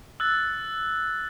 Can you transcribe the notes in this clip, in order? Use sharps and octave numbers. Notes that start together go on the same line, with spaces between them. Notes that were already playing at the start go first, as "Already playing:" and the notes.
E6 F#6 A6